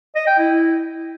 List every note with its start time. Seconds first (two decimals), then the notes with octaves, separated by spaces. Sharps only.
0.16 D#5
0.27 G5
0.39 E4